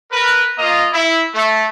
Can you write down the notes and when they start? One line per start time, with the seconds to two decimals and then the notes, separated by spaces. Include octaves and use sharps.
0.11 A#4 B4
0.58 A#3 F4 D#5 A#5
0.93 E4
1.35 A3